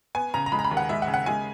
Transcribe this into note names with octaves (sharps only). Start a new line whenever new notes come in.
B3 G#5
C#3 A#5
A#5
G#3 B5
A#5
B5
D#2
F#5
G#3 E5
F#5
C#3
F#5
G#3 G#5